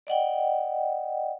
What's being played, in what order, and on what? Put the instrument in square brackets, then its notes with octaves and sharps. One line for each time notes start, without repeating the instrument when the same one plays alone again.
[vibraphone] D5 D#5 F#5 G5